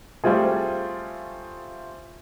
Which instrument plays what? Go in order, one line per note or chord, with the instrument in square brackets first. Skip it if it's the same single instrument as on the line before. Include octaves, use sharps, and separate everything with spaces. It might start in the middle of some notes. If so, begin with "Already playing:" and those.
[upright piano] G3 A3 C4 F4 G#4